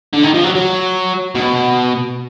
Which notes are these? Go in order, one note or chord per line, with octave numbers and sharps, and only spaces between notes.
D3
D#3
F3
F#3
F#3
B2